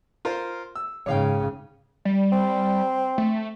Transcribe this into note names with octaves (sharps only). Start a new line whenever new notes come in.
F4 A#4 C5
E6
G#2 C#3 C#5 F5 G5
G3
C4
A3